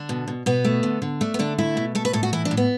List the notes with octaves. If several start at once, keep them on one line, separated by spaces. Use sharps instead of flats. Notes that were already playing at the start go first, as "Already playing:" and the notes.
Already playing: D3 D4
B2
B2
B2 B3
A3
D3
D3
A3 D4
B3
D3 D4
A3 E4
B2
A3 A4
B4
A2 A4
F#4
E3 E4
D4
A2
B3